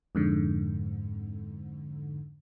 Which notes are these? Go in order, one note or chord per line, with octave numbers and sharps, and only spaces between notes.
F2 G#2 D3